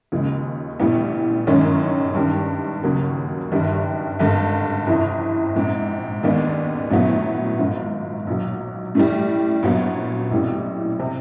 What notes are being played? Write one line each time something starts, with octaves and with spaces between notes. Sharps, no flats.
D#2 C#3 F3 G#3
A#1 A2 E3 G3 B3
G1 F#2 D#3 G#3 C#4
G2 D#3 G3
D#2 C#3 F#3 A#3
G1 G2 D#3 G3
G#1 G2 D3
G1 F2 C3 E3
A#1 G#2 F3 G#3 C4
D#2 D#3 G#3 B3 D4
A#1 A2 F#3 B3
G#1 G#2 F3
B1 A#2 F#3
A2 E3 G3
A#1 A#2 F#3 B3
B1 A2 E3 G3 C4
C3